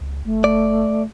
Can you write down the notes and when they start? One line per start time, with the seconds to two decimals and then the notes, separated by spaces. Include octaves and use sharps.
0.01 C#2
0.25 F#1 A3
0.44 D5